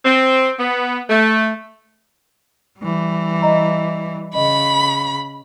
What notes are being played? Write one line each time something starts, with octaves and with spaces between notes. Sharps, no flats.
C4
B3
A3
E3 G3
D#5 A#5
C#3 D#5 B5